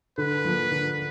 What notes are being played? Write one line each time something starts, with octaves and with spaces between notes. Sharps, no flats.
D3 B4
F3 A#3
D3